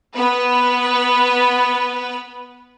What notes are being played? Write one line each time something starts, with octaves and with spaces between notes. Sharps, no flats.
B3 B4